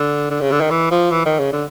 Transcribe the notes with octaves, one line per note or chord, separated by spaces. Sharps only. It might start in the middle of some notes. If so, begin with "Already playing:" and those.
Already playing: D3
D3
C#3
D3
D#3
E3
F3
E3
D#3
C#3
D3